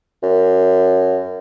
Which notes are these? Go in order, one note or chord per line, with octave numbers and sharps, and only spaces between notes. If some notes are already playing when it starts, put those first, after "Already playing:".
F#2